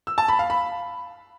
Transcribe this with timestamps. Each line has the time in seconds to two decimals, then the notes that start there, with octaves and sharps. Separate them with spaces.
0.07 E6
0.18 A5
0.28 B5
0.39 F5
0.50 B5